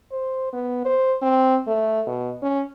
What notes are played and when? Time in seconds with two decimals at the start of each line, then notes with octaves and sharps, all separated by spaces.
0.12 C5
0.52 B3
0.85 C5
1.22 C4
1.67 A3
2.07 B2
2.42 C#4